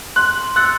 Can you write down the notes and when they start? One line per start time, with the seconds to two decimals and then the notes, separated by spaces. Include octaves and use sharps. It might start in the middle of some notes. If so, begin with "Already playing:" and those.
0.16 C6 F#6
0.56 E6 F#6 A6 C#7